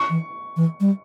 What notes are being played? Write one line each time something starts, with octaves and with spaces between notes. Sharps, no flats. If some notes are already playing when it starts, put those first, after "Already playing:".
Already playing: C#6
E3
E3
G3